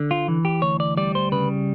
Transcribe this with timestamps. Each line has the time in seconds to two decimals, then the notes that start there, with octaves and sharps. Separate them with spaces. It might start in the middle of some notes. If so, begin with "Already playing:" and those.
Already playing: D3
0.11 F4
0.28 E3
0.45 G4
0.62 D2 C#5
0.80 D5
0.97 G3 D5
1.15 C5
1.32 C#3 B4